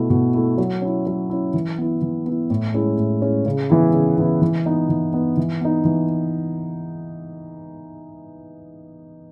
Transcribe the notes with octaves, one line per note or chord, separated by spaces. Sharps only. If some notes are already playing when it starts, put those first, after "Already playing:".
Already playing: B2 A3 E4
B2
A3 E4
F#3
C#4 E4
F#3
C#4 E4
E3
B3 E4
E3
B3 E4
A2
G#3 C#4 E4
A2
G#3 C#4 E4
C#3
E3 B3 E4
C#3
E3 B3 E4
E3
B3 D#4
E3
B3 D#4
E3
B3 D#4
E3